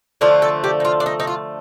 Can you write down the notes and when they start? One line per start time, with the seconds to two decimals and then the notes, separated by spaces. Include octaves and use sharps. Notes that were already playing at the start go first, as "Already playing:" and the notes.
0.21 D3 F3 A3 F4
0.42 A4
0.64 G4
0.80 D#4
0.85 F4
1.00 D4
1.06 D#4
1.20 D#4
1.27 F4